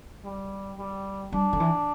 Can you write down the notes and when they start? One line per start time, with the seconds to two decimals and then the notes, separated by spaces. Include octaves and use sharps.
0.24 G3
0.78 G3
1.32 G3 D4
1.53 D3
1.60 E3